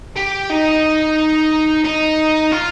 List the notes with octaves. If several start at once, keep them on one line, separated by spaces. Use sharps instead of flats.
G4
D#4
D#4
F4